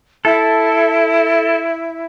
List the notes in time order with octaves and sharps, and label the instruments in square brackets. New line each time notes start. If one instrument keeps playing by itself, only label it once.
[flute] E4 [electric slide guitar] A4